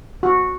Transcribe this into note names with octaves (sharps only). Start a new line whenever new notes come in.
F#4